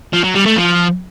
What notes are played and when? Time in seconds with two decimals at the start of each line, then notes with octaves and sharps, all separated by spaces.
0.13 F3
0.24 F#3
0.35 G3
0.46 A3
0.56 F3